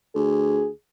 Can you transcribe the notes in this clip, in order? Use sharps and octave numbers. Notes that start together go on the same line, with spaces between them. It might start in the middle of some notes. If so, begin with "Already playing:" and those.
D2 G#4